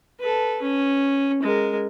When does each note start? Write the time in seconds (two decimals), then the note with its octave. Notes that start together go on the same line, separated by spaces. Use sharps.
0.20 A4 B4
0.62 C#4
1.43 G#3 A#4